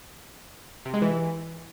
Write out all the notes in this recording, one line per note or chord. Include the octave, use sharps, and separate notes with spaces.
C3
G#3
E3